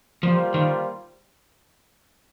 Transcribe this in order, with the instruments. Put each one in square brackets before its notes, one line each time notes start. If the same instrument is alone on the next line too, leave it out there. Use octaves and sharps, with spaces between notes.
[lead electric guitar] F3 [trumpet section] G3 A#3 F4 C5
[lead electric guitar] D#3